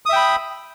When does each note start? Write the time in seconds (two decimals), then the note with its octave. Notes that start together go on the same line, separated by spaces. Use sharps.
0.06 D#6
0.09 E5
0.13 G5
0.16 B5